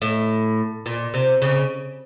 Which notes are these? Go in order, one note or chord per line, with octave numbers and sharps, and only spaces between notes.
A2
A#2
C3
C#3